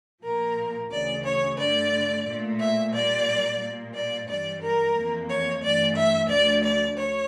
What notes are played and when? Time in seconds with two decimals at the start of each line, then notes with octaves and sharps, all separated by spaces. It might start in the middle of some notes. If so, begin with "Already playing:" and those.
0.24 A#2 F3 A#3 A#4
0.91 D2 C#3 E3 D5
1.25 C#5
1.58 G2 D3 A3 D5
2.26 A#2 A3
2.59 E5
2.93 A#2 G3 A#3 D5
3.60 A#2 G3 A#3
3.94 D5
4.28 G2 E3 G3 D5
4.62 A#4
4.95 F2 E3 A#3
5.29 C#5
5.63 G2 E3 A3 D5
5.96 E5
6.29 D2 D3 F3 A3 D5
6.64 D5
6.97 D2 C#5